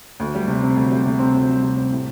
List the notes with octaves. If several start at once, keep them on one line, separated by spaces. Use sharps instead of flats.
D2
G3
C3
C4
D2
G3
C3
C4
D2
G3
C3
C4
A2